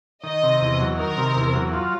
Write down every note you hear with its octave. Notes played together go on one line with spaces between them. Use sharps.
D#3 D#5
C3
E2
F#3
D#3 A#4
C3
E2
F#3
F4